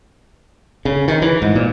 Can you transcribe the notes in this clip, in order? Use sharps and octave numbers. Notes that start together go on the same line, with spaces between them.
C#3
D#3
E3
G#2
A#2